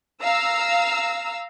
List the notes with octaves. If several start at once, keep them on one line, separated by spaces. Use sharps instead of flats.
F5 A#5 E6